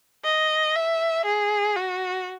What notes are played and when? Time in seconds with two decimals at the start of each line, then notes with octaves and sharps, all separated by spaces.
0.24 D#5
0.75 E5
1.25 G#4
1.76 F#4